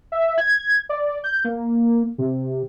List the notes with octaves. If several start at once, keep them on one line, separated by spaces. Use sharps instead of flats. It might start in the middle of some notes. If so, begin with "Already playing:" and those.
E5
G#6
D5
G6
A#3
C3